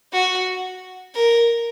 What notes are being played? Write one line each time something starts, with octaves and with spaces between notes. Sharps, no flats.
F#4
A#4